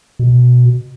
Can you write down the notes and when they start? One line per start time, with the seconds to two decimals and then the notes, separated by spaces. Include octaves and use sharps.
0.19 B2